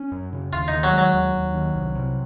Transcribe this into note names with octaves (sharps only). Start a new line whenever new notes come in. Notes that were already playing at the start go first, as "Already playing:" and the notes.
Already playing: C#4
F#2
C#3
D#2 F4
D#3 D#4
F#3
G#3
F#3
D#2
D#2
D#3
C2
C3